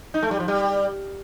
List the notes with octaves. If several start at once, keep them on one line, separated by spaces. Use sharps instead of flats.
D#4
A3
G3
F3
G3